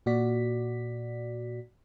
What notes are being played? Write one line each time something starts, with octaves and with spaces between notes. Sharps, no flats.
A#2 F#4 D5 B6